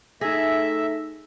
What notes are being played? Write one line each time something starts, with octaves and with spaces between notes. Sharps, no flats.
A3 D#4 G#4 E5 A#6